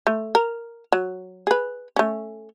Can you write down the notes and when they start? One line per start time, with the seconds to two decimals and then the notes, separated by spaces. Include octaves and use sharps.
0.07 A3
0.35 A#4
0.92 F#3
1.47 G#4 B4
1.96 A3 C#4